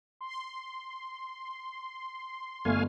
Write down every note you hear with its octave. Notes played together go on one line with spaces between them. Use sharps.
C6
G1 A3 F5 G#5